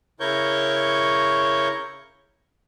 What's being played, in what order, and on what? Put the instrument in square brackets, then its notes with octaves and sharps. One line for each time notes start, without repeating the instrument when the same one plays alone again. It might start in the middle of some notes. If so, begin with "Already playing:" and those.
[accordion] C#3 E4 A#4 C#5 C#6 G6